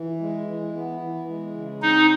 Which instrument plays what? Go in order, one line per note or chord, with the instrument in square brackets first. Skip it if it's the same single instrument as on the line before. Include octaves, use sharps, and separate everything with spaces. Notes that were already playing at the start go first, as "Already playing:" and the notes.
Already playing: [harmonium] E3
G#3
E3
B3
E3
G#3
C#3
[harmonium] C4 [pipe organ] D#4